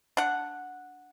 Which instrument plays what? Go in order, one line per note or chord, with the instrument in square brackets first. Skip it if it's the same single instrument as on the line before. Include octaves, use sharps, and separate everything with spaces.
[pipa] D4 F#5